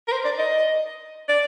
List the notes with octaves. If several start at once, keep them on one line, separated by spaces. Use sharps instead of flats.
A#4
C5
D5
D#5
D5